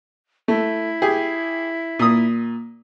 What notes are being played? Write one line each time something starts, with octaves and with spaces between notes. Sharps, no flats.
A3 E4
G4 G#4
A#2 D#6